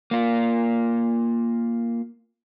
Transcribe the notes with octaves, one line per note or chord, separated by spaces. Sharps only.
A#3 F4